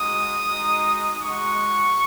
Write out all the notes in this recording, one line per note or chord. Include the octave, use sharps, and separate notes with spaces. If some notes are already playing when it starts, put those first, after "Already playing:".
Already playing: G#3 D#4 F#4 D#6
G#3 D#4 F#4
G#3 D#4 F#4 C#6